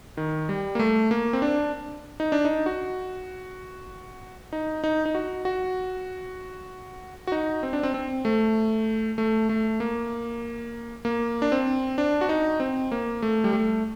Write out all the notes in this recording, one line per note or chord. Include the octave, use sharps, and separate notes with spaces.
D#3
G3
A#3
A3
A#3
C4
D4
D#4
D4
D#4
F#4
D#4
D#4
D#4
F#4
F#4
F#4
D#4
C4
D4
C4
C4
A3
A3
A3
A#3
A#3
D4
C4
D4
F#4
D#4
C4
A#3
A3
G3
A3